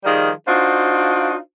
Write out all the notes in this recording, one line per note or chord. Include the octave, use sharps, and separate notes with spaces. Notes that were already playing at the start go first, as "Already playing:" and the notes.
D#3 F3 G3 G#4 A#4
D4 D#4 F4 F#4 C5